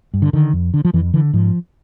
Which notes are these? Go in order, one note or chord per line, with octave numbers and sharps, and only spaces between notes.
G2
D3
D3 D#3
F2
D3
F3
F2 E3
D3 E3
G#2 F3